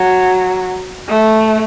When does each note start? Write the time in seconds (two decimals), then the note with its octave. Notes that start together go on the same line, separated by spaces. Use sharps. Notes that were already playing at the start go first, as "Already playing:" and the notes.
Already playing: F#3
1.08 A3